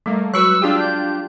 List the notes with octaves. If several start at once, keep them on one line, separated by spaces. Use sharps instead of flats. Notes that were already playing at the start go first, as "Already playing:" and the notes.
G3 A3 A#3
F#3 G#3 F#4 B4 C#6 E6 F#6
D4 F4 G4 G#4
G6